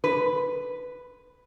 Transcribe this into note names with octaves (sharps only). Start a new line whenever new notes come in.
B4